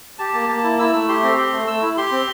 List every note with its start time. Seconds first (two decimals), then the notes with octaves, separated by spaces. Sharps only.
0.19 G4 A5
0.34 A#3 A5
0.49 A#3 A5
0.64 E4
0.79 E4 E6
0.93 A3 E6
1.08 G4 C6
1.23 C4
1.37 G4
1.52 A3
1.67 A3 E6
1.82 E4
1.97 G4 C6
2.12 C4